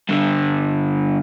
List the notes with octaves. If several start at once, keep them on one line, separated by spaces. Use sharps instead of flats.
G2 D3